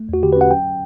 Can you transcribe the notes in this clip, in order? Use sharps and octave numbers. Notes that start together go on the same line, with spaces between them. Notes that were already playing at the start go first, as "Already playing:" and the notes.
Already playing: A3
E2 F#4
D3 G4
B4
C#4 F#5
F#3 G5